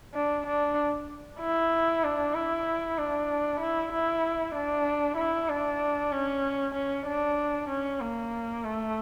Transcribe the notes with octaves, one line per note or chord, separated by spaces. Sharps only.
D4
D4
E4
D4
E4
D4
E4
E4
D4
E4
D4
C#4
C#4
D4
C#4
A#3
A3